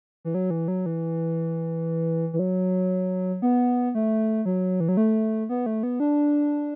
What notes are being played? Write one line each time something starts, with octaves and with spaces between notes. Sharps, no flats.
E3
F#3
E3
F#3
E3
E3
F#3
B3
A3
F#3
E3
F#3
A3
B3
A3
B3
D4